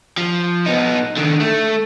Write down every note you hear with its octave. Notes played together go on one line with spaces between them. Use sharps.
F3
B3 D#4
D3 D#3
A3